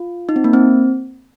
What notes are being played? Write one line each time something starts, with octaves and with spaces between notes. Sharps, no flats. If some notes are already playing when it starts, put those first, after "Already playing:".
Already playing: F4
D#4
C4
A#3
C4